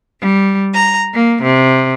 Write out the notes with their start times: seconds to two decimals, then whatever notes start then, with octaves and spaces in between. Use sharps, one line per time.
0.19 G3
0.74 A#5
1.12 A#3
1.41 C3